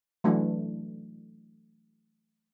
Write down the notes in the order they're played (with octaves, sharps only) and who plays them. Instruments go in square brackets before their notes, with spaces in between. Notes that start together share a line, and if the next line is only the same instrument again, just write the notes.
[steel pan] E3 F#3 A3 D4